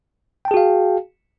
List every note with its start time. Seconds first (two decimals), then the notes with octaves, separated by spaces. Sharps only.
0.45 G5
0.48 A5
0.51 G#4
0.54 F#4
0.57 F5